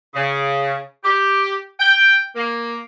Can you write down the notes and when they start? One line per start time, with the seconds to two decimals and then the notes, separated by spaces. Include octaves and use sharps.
0.15 C#3
1.04 G4
1.80 G5
2.36 A#3